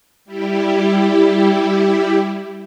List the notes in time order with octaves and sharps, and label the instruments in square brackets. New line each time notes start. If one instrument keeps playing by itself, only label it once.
[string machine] G3 E4 G4